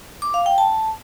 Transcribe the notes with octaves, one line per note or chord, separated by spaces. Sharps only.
D6
F5
G5
A5